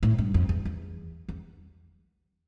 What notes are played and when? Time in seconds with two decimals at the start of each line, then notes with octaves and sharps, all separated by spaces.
0.03 A2
0.18 G2
0.34 F2
0.49 E2
0.65 E2
1.29 E2